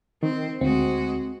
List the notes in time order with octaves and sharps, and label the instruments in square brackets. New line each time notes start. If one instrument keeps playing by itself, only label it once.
[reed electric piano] D#3 [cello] C4
[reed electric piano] D2 [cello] G#3 F#4 [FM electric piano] C4